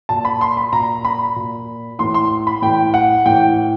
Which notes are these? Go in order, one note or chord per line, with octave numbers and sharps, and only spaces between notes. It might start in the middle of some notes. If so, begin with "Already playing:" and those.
A#2 A5
B5
C6
B5
A#2 A#5
B5
A#2
A2 E3 C6
C6
B5
A2 E3 G5
F#5
A2 E3 G5